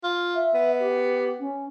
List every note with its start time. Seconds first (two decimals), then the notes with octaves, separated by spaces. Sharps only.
0.04 F4
0.35 E5
0.54 B3
0.80 G4
1.39 C#4